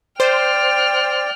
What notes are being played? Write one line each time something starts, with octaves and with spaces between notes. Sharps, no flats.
C5 D5 G5 F6